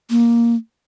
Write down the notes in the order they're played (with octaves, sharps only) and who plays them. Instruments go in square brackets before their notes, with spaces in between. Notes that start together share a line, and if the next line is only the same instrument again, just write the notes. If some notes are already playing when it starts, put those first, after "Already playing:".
[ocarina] A#3